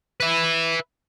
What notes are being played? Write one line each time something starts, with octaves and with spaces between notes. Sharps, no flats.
B4 E5